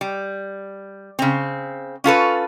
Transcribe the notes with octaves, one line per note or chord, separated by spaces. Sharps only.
G3
C#3 C4
C#4 F4 A4 B4